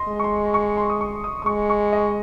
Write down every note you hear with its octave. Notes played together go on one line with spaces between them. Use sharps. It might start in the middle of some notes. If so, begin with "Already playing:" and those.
Already playing: D#5 C6
G#3
C#6
C6
C#6
C6
D#6
C#6
D#6
D#6
G#3 C#6
C#6
D#5